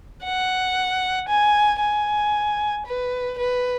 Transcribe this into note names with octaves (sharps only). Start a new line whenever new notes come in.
F#5
G#5
G#5
B4
B4